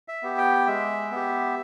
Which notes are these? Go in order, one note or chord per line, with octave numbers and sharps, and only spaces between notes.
E5
B3 G4
G5
G#3 E5
B3 G4